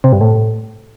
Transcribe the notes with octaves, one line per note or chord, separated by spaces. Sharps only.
C3
G2
A2